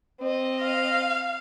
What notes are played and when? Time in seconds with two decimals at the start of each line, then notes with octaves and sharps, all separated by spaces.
0.20 C4 D#5
0.62 F5